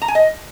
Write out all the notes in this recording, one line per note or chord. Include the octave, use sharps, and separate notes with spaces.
A#5
G#5
D#5